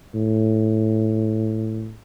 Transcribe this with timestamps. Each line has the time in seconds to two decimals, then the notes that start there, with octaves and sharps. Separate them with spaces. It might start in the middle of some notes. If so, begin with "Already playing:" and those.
0.15 A2